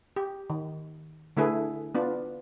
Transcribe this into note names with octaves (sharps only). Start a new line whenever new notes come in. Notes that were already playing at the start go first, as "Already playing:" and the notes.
G4
D#3
D3 A3 E4 G#4 B4
B3 D4 F4